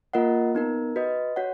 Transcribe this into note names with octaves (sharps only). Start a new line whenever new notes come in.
A#3 F4 A#4 D#5 F#5
B3 D#4 A#4
F#4 B4 D#5
F#4 C#5 F#5